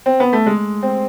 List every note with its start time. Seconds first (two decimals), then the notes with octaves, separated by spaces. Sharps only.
0.06 C4
0.20 B3
0.33 A3
0.46 G#3
0.83 C4